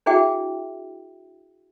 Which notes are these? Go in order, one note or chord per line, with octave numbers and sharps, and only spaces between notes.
D4 E4 F#4 G#4 E5 G5